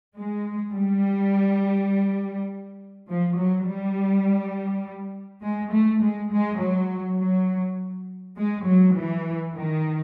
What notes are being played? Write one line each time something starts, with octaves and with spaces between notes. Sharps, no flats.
G#3
G3
F3
F#3
G3
G#3
A3
G#3
G#3
F#3
F#3
G#3
F#3
E3
D#3